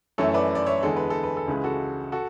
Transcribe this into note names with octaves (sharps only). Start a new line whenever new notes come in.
F#2 E3 A3 A4 C#5
B4 D5
D5
C#5 E5
E2 D3 G#3 A4
B4
A4
B4
A4
C#2 C#3 E3 G#3 B4
F#4 A4
F#4 A4